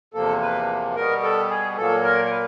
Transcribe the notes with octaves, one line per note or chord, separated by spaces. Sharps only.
E2 C3 F3 A#3 A4
B4
B2 G3 B3 A#4
A4
G#4
A#2 F#3 A#3 A4
A#4
A#4
B4